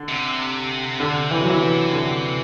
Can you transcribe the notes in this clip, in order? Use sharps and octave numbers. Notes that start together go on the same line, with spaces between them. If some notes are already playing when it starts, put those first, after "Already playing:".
Already playing: D3
C3
D3
E3
F#3
E3
D3